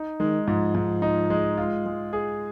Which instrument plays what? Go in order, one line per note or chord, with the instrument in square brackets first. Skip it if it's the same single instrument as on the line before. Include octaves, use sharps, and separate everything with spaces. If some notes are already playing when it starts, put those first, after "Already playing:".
Already playing: [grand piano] D#4
[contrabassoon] D#3 [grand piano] G#3
[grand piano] G#2 [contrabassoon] F3
[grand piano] G#2
D#4
G#3
F4
G#3
G#4